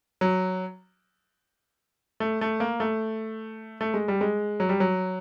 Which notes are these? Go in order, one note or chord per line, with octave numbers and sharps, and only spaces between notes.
F#3
A3
A3
A#3
A3
A3
G#3
G3
G#3
F#3
G3
F#3